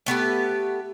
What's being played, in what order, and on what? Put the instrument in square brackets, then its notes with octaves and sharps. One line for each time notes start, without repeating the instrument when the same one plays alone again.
[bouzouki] A3 B3 G4 B4